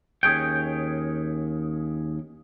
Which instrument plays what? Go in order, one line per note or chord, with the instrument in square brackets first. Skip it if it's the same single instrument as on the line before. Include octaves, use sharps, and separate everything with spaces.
[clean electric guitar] D#2 C#4 G#4 C#5 G5